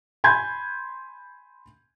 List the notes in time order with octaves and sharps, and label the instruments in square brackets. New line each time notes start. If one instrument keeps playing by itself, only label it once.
[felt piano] G#5 B5 C6 G6 G#6